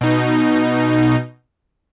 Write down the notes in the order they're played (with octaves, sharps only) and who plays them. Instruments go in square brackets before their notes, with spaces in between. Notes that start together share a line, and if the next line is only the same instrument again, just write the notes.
[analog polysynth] B2 D#4